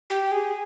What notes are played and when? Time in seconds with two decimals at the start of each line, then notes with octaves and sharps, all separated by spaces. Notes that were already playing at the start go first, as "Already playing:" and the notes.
0.10 G4
0.32 G#4